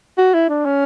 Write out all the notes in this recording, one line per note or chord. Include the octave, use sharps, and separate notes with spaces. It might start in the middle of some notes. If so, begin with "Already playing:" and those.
F#4
E4
D4
C#4